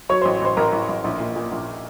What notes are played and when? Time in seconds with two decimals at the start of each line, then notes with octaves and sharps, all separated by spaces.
0.09 F#3 C#5 C#6
0.21 A1 C5 C6
0.42 A1 C5 C6
0.57 A1 A#4 A#5
0.73 A1
0.89 A1
1.04 A#1
1.20 A#2
1.36 A#2
1.52 A#1